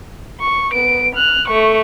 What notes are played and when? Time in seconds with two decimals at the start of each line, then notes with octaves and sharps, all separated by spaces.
0.41 C#6
0.72 B3 D7
1.15 F6 F#6
1.48 A3 C#6